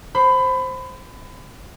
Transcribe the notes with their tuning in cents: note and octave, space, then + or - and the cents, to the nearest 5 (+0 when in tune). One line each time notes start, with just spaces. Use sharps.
C5 +5 B5 +25